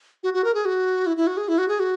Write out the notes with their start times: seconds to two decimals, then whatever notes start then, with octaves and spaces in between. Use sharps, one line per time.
0.23 F#4
0.34 F#4
0.44 A#4
0.54 G#4
0.65 F#4
1.06 E4
1.17 E4
1.27 F#4
1.37 G#4
1.48 E4
1.58 F#4
1.68 G#4
1.80 F#4